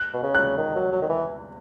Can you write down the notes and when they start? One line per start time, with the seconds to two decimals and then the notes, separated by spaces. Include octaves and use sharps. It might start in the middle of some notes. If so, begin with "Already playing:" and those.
Already playing: F#6
0.14 B2
0.23 C#3
0.35 F#6
0.57 D#3
0.75 F#3
0.92 F#3
1.02 D#3
1.09 E3